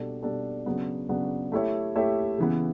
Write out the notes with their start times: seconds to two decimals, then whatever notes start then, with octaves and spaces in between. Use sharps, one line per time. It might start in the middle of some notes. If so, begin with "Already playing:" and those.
Already playing: B2 G3 D4 A4
0.22 B2 G3 D4 A4
0.66 C#3 F#3 B3 D4
1.09 C#3 F#3 B3 D4
1.52 A3 E4 G4 C#5 E5
1.95 A3 E4 G4 C#5 E5
2.38 C#3 E3 B3